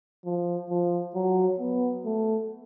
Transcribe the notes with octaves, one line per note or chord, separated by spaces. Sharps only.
F3
F3
F#3
B3
A3